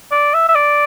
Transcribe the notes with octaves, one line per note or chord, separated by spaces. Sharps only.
D5
E5
E5
D5